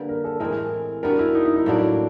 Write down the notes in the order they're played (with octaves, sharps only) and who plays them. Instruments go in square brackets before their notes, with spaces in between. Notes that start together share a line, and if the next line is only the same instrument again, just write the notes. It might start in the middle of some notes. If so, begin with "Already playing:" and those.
Already playing: [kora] D3 G3 A#3 [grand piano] B4
[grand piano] A#4
A4
[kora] A2 E3 G#3 C4 [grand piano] A#4
[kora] G3 B3 D4 F#4 [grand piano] A#4
[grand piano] E4
D#4
E4
D#4
[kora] A2 F#3 A#3 D4 [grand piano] E4